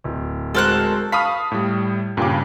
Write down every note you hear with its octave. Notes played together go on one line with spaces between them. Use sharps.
D1
G#3 F#4 A4 A#4 C5 F#6
F5 A5 B5 C#6 D#6 F6 B6
A2 G3
G2 A#2 C#3 G5 D6